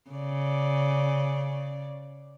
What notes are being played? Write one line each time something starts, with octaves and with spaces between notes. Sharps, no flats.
C#3 D5